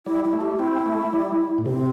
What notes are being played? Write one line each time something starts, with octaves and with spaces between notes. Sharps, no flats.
G3 E4
E4
A3
G4
C4 E4
A3
G3
A2
C3 C4